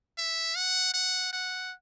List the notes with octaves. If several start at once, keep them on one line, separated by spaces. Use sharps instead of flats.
E5
F#5
F#5
F#5